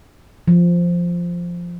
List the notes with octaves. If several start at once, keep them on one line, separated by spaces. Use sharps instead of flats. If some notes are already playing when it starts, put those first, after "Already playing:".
F3